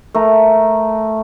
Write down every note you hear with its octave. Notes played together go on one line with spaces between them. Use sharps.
A3 A#4